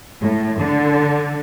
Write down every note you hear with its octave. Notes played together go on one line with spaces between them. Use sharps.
A2
D3